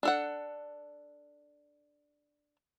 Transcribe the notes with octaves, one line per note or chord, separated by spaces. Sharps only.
D4 A4 F#5